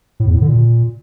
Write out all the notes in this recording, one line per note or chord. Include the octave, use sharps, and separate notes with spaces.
A2
E2
A2
D3
A#2